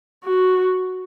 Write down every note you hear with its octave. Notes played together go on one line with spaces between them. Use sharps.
F#4